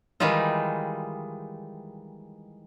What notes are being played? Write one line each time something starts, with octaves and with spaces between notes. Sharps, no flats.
D#3 E3 G3 G#3 D#4 F4